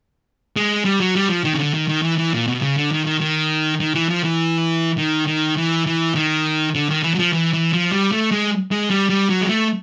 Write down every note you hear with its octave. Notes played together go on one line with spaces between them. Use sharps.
G#3
G3
F#3
G3
F3
D#3
C#3
D3
D#3
D#3
E3
E3
A#2
B2
C#3
D3
D#3
D#3
D#3
D#3
E3
F3
E3
D#3
D#3
E3
E3
D#3
D3
D#3
E3
F#3
F3
E3
E3
F3
G3
A3
G#3
G#3
G3
G3
F#3
G#3
A3